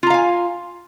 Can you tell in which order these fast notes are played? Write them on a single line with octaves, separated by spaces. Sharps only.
F4 A#5 F5 G#5